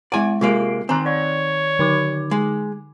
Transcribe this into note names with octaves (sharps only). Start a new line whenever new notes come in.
G#3 E4 D5 F#5 G#5
C3 G#3 A#3 F4 C7 D7
D#3 C4 G#5 A#5 F#6
C#5 D5
D3 D#4 D6
G#3